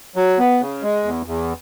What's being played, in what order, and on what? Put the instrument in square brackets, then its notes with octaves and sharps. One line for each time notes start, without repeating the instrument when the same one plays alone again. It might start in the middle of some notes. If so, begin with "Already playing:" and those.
[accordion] F#3
B3
C#3
G#3
E2
E2